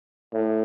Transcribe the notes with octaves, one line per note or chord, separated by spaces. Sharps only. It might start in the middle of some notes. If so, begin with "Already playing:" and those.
A2